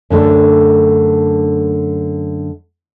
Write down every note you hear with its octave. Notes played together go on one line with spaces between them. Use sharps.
F#2 D3 A3 D4